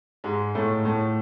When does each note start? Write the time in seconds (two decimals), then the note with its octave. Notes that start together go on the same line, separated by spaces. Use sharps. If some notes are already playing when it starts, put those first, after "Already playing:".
0.24 G#2 G#3
0.55 A2 A3
0.85 A2 A3